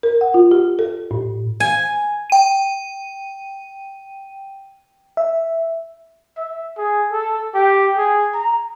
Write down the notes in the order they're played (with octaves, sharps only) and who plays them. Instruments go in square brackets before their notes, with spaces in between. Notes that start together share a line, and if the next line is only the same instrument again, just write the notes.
[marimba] A#4
F#5
F4
G4
A4
A2
[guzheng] G#5
[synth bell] G5 D#7
[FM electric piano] E5
[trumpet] E5
G#4
A4
G4
G#4
A#5